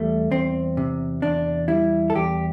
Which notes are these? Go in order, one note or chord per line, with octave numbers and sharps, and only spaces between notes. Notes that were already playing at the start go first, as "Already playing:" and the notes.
Already playing: E2 G3 A3
E2 C4
C3
E2 D4
G3 E4
A4
E2 G4